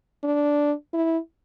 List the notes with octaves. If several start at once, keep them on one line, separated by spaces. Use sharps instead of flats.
D4
E4